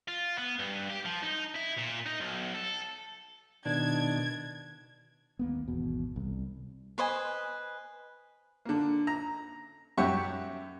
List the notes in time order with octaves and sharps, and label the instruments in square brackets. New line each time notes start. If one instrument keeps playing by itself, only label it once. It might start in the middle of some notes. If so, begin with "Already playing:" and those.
[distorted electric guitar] F4
B3
G2
G4
F3
D#4
E4
A#2
D#4
B1
A4
[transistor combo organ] B2 D#3 [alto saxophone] D4 [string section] G#6
[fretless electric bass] D#2 A#3 B3
G#1 E2 B2
C2
[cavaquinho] B4 C5 D#5 G#5
[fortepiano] D3 A#3
A#5
F#2 G4 E5 F#5 C#6